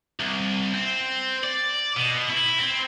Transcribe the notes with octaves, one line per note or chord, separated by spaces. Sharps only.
C2
C4
D5
B2
E4
C4